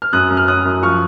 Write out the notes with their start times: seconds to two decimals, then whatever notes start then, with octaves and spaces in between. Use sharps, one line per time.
0.02 F6
0.13 F#2 D#6 F#6
0.30 F#2
0.37 F6
0.48 F#2 D#6 F#6
0.65 F#2
0.83 F3 C#6 F6